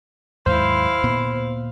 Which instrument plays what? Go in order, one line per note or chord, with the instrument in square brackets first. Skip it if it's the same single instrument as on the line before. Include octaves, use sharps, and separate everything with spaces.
[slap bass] D#2 G#2 F#3 [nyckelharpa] E4 F5 [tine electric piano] C5
[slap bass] D2 A#2 B3